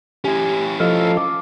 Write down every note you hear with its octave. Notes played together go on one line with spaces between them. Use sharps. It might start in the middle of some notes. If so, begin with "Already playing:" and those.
C#4 E4 G4 G#5
F3 A4 D#5 F5
D6